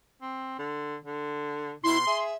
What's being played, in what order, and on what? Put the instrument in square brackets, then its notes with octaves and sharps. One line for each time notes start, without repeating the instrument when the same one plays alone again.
[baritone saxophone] C4
D3
D3
[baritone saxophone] B2 [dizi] E4 [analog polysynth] C6
[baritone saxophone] G#4 [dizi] E5